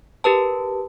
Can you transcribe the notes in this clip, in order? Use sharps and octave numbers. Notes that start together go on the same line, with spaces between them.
G4 A#4 B4 A5